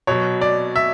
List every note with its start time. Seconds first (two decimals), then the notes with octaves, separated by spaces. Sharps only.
0.07 B2 F#3 C#5
0.41 D5
0.76 E5